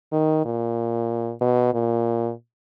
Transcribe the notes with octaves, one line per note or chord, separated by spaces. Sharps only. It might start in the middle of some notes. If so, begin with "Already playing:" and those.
D#3
A#2
B2
A#2